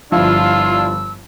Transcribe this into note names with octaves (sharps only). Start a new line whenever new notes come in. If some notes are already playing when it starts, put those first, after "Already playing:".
G1 F3 D4 E4 F4 E6